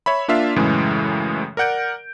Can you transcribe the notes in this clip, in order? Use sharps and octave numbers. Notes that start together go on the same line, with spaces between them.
C#5 E5 B5
A#3 D4 F4 E5 F5
F#2 A2 C#3 E3 G#3
A#4 D5 F#5 G6 D7